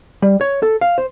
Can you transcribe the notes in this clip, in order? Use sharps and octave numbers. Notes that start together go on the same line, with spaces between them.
G3
C#5
A4
F5
C5